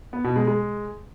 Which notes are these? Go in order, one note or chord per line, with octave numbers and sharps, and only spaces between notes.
B3
B2
G#3
G#3